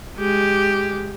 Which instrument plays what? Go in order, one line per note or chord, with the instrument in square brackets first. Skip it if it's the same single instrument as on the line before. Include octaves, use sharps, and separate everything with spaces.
[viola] G#3 G4